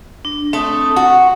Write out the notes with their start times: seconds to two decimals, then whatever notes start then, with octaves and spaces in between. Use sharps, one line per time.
0.25 D4
0.53 A3 C4 A5 D#6
0.96 F#4